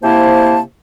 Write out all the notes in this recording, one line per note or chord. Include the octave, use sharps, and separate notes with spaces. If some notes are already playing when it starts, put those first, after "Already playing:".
C3 A#3 E4 C5 A5